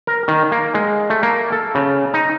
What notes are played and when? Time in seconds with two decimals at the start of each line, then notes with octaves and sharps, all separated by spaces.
0.07 A#4
0.28 D#3
0.52 A#3
0.74 G#3
1.10 A3
1.23 A#3
1.52 A4
1.75 C#3
2.14 D#4